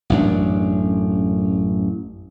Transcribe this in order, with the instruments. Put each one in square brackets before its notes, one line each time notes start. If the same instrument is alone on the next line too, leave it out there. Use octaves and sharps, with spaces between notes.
[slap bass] A1 F#2 D4